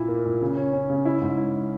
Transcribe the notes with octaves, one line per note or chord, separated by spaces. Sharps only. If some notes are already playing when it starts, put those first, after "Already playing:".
Already playing: A#2 E4
A#3
A#2
C#3
C#4
C#4
C#3
E4
G#2
E4